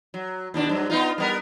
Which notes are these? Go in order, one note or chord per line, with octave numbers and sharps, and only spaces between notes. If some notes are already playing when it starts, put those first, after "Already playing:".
F#3
D#2 B2 D4
G2 F#3
B3 D#4 F4
G3 B3 A#4